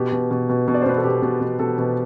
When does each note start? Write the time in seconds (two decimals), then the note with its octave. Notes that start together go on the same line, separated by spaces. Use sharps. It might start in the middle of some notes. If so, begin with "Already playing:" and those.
Already playing: B2 G4
0.12 B2
0.31 B2
0.49 B2
0.68 B2
0.74 D5
0.82 C5
0.86 B2 B4
0.97 A4
1.04 B2 G4
1.22 B2
1.41 B2
1.59 B2 A4
1.78 B2